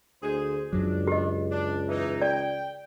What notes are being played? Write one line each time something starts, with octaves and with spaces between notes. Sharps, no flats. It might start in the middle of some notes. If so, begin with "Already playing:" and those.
D2 G#4 C5
C#2 F#2 F#3 D4
G4 D#5
D4
E3 D#4
D5 G5